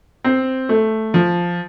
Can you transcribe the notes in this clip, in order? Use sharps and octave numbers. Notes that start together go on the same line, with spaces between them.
C4
A3
F3